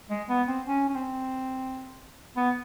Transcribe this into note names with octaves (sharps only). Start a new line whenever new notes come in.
G#3
B3
C4
C#4
C#4
C4
B3